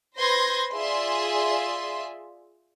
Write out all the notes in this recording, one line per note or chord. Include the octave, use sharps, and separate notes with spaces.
B4 C5 C6 G6 G#6 A#6
F4 G#4 D5 E5 G#5 C6